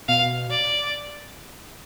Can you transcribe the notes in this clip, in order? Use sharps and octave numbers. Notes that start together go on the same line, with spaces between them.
B2 F5
D5